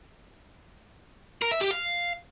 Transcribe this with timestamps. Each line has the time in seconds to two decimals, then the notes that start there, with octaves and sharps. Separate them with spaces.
1.42 A#4
1.51 E5
1.61 G4
1.71 F5